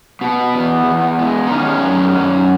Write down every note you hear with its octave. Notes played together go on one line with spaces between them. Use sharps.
B2 B3
E2
E2
G#3
D#4
D#3 C#4
F#2
F#2